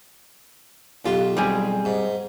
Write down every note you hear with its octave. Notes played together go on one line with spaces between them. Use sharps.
B1 F4 G4
G3 C4 G#4
G#2